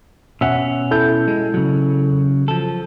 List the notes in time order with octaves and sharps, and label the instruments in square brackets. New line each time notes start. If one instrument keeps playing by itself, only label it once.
[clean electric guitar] B2 C#4 [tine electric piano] E5 F#5
[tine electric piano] E4 A4 G6
[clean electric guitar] G#3
C#3 F#3
F3 A4